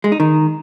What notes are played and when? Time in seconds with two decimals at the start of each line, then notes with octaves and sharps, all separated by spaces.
0.04 G#3
0.12 D#4
0.20 D#3